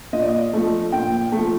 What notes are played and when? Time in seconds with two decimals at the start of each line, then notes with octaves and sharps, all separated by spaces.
0.13 A#2 D#5
0.21 D5
0.28 D#5
0.53 F3 A3
0.92 A#2 G5
1.32 F3 A3